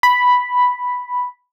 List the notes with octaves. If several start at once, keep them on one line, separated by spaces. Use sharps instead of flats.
B5